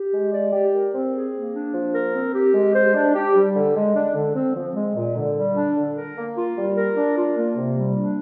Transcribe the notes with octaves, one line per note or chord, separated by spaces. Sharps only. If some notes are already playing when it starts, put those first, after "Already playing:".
Already playing: G4
G#3
D5
G4
A#4
C4
G#4
A#3
D4
F3
A#4
C4
G4
G#3
C5
D4
G4
G3
D3
G#3
D4
D3
C4
F3
G#3
A#2
D3
G3
D4
D3
A#4
A#3
F4
G3
A#4
D4
F4
A#3
C3
G3
D4